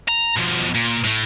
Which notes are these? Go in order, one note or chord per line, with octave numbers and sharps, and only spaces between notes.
A#5
B2 F3
A#2
A2 A3